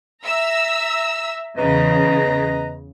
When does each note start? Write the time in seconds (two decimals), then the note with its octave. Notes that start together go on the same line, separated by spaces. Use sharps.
0.24 E5 A#5 E6
1.57 E2 C#3 B4 D#5 A#5